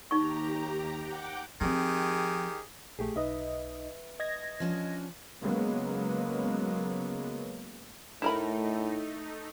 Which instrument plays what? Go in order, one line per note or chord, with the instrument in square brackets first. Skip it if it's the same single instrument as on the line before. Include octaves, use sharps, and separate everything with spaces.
[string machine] D#2 G4 A#5 [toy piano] D#4 C#6
[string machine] F#5 G5 D6
[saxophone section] D#3 G4 G#4 [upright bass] F3 C4
[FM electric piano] A#1 [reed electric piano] A3 G4 G#4
[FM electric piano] B1 D#4 D#5 [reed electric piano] B4 E5
[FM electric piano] D#5 G#6 A#6
[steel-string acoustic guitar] F3 C#4 D4
[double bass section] C#3 F#3 G#3 A#3 B3
[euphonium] A2 [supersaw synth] A3 D#4 [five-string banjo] E4 A#4 B5